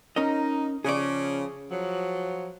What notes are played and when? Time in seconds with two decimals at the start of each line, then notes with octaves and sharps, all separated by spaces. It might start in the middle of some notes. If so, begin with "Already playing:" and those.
0.16 C#4 D#4 A#4 D#5
0.85 C#3 F3 G#4 D5
1.71 F3 F#3